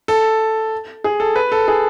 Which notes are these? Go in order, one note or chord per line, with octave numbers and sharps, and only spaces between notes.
A4
G#4
A4
B4
A4
G#4